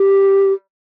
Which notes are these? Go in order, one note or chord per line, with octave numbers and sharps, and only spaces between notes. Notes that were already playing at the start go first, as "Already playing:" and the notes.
Already playing: G4